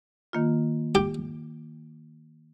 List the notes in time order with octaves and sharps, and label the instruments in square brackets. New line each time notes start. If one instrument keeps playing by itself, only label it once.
[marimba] D#3 A#3 F4
[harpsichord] G4